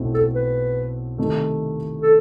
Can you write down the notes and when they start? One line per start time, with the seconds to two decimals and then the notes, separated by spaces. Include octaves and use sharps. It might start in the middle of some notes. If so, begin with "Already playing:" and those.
Already playing: B1 B2 A3 C4 E4
0.14 A4
0.35 B4
1.18 C3 D#3 A3 D#4
2.02 A4